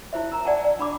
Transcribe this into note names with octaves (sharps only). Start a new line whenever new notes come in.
E4 F4 C5 E5
A#4 A#5
D5 F#5 G#5 A5
D5
D4 B5 D6